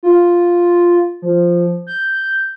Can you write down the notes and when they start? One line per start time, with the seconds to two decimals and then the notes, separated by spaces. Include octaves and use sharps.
0.03 F4
1.22 F3
1.87 G6